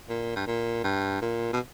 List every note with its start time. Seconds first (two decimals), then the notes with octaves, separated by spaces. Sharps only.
0.09 A#2
0.36 G2
0.47 A#2
0.84 G2
1.21 A#2
1.53 B2